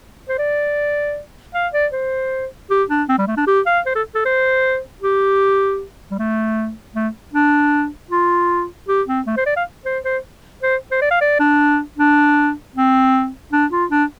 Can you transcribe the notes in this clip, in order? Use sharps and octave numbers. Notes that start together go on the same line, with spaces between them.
C5
D5
F5
D5
C5
G4
D4
C4
G3
A3
D4
G4
F5
C5
A4
A4
C5
G4
G3
A3
A3
D4
F4
G4
C4
A3
C5
D5
F5
C5
C5
C5
C5
D5
F5
D5
D4
D4
C4
D4
F4
D4